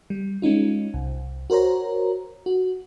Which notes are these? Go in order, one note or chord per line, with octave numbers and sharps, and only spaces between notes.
G3
G#3 C#4 D#4 F4
C2
F#4 A#4 C5 C#5 A#5
F#4